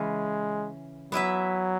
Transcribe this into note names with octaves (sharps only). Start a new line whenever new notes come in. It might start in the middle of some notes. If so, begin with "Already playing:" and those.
Already playing: C#3 E3 G#3 C#4
F#3 B3 E4 B4 E5